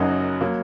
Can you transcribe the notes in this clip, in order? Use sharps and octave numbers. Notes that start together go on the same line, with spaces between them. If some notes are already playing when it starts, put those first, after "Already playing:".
Already playing: F#1 F#2 F#3 D#4 F#4
F#3 A#3